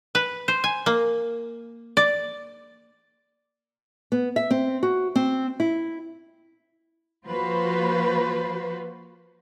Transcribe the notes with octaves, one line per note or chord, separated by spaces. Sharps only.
B4
C5
G#5
A#3
D5
B3
E5
C4
F#4
C4
E4
F3 A#3 F4 F#4 B4 C5